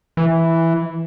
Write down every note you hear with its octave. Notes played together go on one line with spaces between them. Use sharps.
E3